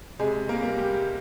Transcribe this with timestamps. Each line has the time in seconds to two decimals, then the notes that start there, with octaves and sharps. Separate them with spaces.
0.19 C3 G#3 G#4
0.49 A#3 A#4
0.63 G3 A#3
0.77 G3 G4